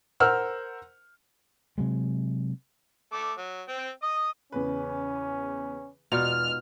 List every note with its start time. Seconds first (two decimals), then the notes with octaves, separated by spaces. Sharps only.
0.20 A#4 C5 F#5 E6 F6
1.78 C3 F#3 G#3
3.12 A3 D6
3.38 F#3
3.68 C4 G5
4.02 D#5 D#6
4.52 E2 C#3 C#4 B4
6.12 E1 B2 D#4 F4 D5 F6